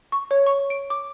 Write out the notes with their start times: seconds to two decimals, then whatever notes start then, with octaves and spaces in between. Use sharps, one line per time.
0.12 C#6
0.31 C#5
0.47 C#6
0.70 D7
0.90 D6